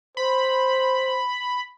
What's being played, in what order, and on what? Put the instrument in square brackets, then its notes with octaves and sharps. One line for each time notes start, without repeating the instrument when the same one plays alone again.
[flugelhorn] C5 [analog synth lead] B5